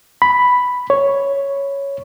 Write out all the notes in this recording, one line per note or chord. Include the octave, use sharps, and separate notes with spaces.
B5
C#5